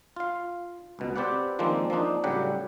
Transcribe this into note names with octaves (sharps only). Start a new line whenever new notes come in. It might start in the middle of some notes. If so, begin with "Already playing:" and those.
F4 F5
C#2 B2
C4 G4 B4 D5 F#5
D#3 F3 G#3 A#3 C4 D4
F3 A#3 C4 D4 D#4
A2 C#3 F#3 G3 G4 F#5